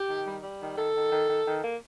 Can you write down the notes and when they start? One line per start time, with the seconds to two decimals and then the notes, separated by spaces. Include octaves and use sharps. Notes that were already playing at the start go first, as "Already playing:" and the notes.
Already playing: G4
0.10 D#3
0.27 G3
0.43 G3
0.61 D#3
0.77 D#3 A4
0.95 D#3
1.11 D#3
1.28 D#3
1.45 D#3
1.63 A#3